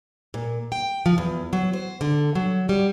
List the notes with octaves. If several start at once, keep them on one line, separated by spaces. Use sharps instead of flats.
A#2
G5
F3
E2
F#3
C5
D3
F#3
G3